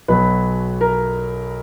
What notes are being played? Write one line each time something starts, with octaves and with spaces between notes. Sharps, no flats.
B1 B2 F#3 B4 B5
A#4 A#5